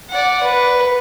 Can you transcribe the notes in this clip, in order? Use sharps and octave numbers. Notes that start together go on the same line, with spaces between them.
D5 F#5
B4